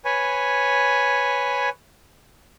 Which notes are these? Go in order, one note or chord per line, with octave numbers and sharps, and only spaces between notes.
B4 C#5 G#5